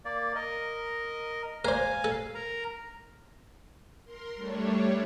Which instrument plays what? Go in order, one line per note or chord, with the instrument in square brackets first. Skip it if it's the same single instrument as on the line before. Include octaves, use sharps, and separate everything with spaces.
[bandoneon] A#3 D5
A#4 D#5
[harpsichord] A#4 C5 [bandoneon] F5 G#5
[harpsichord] A4
[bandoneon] A#4 A#5
[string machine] A#4 C6
G3 A3 D4 C#5